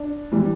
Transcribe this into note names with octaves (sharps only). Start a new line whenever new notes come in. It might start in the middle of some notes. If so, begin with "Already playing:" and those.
Already playing: D4
E3 G3